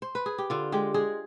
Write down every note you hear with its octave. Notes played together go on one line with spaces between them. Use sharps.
C5
B4
G#4
G4
D3 F4
G#3 G4
G#3 G#4